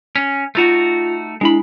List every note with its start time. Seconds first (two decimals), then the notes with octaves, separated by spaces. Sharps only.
0.16 C#4
0.55 A3 D#4 F4 F#4 A6
1.41 G#3 D4 E4 B5